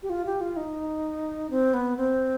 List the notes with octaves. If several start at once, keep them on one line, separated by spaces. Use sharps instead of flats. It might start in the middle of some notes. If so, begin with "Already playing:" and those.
G4
F4
G4
F4
D#4
C4
B3
C4